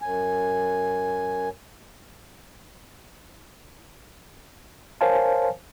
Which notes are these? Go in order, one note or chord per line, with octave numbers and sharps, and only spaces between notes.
F#2 G#5
A#4 C5 C#5 F5 G#5 A5